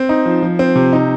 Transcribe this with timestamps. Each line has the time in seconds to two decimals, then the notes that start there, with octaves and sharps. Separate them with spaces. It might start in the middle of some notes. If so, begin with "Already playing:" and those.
Already playing: C4
0.09 D#4
0.26 F3
0.42 F3
0.59 C4
0.75 C3
0.93 D#4